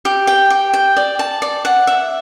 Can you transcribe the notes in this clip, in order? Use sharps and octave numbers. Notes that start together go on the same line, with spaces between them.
G4
G5
G4
G5
D5
A5
D5
F#5
E5